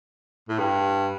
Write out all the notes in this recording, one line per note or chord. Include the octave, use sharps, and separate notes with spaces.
A2
G2